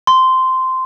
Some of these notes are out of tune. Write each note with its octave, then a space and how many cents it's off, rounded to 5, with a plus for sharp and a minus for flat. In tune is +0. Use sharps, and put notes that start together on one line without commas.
C6 -10